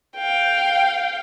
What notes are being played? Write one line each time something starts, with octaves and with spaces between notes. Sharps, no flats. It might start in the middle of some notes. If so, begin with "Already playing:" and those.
F5 G5